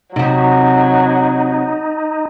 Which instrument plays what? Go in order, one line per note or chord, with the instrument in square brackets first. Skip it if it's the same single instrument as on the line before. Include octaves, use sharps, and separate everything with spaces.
[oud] C3 F#4 [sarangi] F#3 [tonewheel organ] D#4